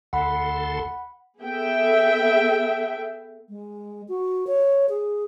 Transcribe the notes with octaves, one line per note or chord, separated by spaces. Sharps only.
D2 A4 F#5 B5 C6
B3 G#4 A4 E5 G5
G#3
F#4
C#5
G#4